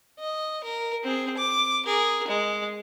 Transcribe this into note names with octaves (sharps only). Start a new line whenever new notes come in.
D#5
A#4
C4 G#4
D6
G#4 A#4
G#3